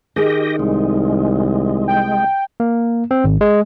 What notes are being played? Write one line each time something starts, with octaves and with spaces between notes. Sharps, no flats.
D#3 G4 G#4 D#5
C2 G#3
G5
A#3
C4
G#1
G#3